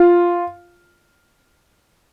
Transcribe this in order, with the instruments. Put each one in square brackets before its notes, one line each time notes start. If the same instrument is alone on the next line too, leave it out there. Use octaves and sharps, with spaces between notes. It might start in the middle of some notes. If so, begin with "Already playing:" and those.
Already playing: [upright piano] F4